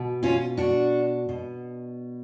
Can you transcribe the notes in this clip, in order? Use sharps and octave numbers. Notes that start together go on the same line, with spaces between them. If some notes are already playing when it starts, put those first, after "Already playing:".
Already playing: B2
C#4 F4
D4 F#4
B2